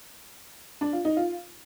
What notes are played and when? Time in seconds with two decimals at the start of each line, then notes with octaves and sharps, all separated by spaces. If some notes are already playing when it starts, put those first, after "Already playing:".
0.81 D4
0.93 F4
1.05 D#4
1.17 F4